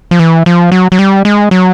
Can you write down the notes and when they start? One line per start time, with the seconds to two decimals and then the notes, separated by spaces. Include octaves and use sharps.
0.11 F3
0.19 E3
0.46 F3
0.72 F#3
0.92 F#3
0.99 G3
1.25 G#3
1.51 F#3